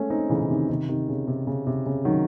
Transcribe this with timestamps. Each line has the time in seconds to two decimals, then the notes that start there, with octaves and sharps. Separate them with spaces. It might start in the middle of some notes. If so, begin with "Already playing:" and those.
Already playing: G#3 A3 C#4
0.10 C4 D#4
0.30 C#3 E3
0.41 C#3
0.49 C3 D#3
0.69 C3 D#3
0.89 C3 D#3
1.09 C#3
1.27 C3
1.47 C#3
1.67 C3
1.86 C#3
2.05 D#3 F#3